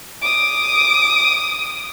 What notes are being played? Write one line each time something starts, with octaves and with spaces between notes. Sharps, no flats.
D6 D#6